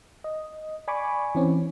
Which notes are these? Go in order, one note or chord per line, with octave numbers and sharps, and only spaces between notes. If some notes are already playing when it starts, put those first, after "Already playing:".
D#5
D5 G#5 B5 C#6 D6
E3 C4 C#4